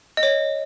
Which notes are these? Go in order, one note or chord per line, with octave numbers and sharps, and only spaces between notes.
D#5
C#5